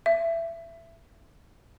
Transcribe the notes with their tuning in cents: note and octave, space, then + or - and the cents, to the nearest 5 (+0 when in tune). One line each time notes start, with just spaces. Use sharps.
E5 +20